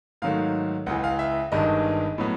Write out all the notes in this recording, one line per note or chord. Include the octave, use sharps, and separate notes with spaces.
G#2 D#3 F#3 A3 F5
C#2 C#3 E3 F#5
F5
E5
G1 G2 D#3 G#3 D#5
A2 F#3 B3